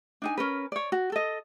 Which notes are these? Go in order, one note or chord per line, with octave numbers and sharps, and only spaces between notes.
D4 D#4 G#5
C#4 A#4 B4
C#5 D5
F#4
A4 D#5